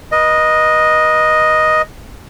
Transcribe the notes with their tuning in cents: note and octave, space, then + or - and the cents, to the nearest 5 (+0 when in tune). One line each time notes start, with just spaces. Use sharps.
B4 -40 D#5 +0